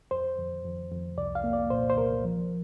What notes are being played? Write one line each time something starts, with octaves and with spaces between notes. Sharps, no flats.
F2 C5
F2
F2
F2
C2 D5
F5
A#3
D5
A#2 C5
C5
C2 A#4
F3